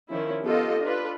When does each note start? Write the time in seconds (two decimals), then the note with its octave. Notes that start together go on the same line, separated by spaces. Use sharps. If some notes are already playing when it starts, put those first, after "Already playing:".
0.10 D#3 F3 C#4 E4
0.43 B3 F4 G4 A4 D#5
0.81 D4 F4 A4 B4